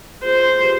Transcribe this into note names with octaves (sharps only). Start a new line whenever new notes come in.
F4 G#4 C5
G4 B4